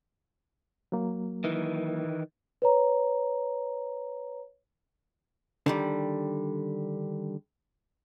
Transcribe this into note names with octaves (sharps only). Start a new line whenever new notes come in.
F#3 A#3
D#3 E3
B4 C#5 A#5
D3 D#3 G3